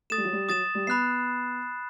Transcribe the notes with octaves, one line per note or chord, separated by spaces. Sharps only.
A3 D#6 A6 E7
G3
F#3
G3
F#3 D#6 A6 E7
G3
B3 B5 F#6 C7